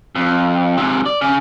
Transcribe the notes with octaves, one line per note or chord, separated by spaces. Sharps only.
F2
G#2 C3
D5
C#3